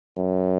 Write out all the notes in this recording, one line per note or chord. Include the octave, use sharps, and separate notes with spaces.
F#2